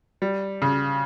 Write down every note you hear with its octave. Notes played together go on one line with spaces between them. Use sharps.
G3
C#3